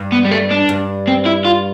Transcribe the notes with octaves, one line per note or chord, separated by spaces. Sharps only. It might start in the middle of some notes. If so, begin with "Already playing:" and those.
Already playing: G2
B3
G3
A3
D4
G2
C4
E4
F4